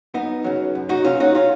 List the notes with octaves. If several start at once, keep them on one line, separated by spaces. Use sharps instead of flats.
F#2 B3 D#4
C#3 F#3
F#2
D#4 F#4
C#3 F#3 C#4 F4
D#4 F#4
C#4 F4